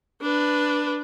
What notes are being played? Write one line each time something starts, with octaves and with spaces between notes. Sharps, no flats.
D4 B4